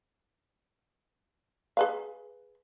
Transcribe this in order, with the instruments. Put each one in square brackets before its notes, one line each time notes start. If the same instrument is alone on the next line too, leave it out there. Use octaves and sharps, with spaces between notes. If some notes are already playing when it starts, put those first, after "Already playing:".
[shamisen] G#4 B4 F5